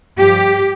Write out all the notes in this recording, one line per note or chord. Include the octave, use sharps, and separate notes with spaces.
G2 F3 G4